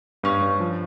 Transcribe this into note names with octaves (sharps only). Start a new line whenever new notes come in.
G2 C#4
G2
F3